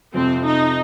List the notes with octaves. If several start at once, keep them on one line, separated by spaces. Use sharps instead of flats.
F2 C3 F3 C4
D#4